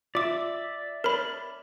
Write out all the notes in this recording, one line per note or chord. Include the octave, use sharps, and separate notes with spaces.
F4 D5 E5 D6
A#4 C#5 B5